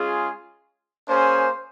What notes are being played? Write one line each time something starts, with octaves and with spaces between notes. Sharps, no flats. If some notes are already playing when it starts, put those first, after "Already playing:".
Already playing: G#3 C#4 F4 G#4
A#3 C#4 G#4 C5